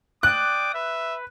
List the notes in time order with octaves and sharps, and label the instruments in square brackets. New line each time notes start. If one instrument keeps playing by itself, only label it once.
[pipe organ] D5 G5 D#6 [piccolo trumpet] D6 [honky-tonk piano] F#6
[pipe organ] B4 [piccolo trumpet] E5